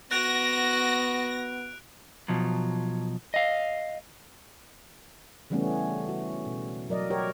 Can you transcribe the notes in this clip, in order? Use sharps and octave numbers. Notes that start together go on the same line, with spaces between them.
B3 F#4 F#6 A#6 D7 F7
B2 F3 F#3
D#5 F5
C#3 E3 G3 A3 B3 C#4
F#4
B2
F#3 A#4 D5 D#5
F#4 G4 A#4 C#5